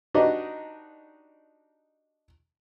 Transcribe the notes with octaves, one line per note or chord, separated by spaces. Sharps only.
D4 D#4 F#4 G4 B4 D#5